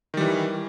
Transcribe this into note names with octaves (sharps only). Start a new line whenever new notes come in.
D#3 E3 G3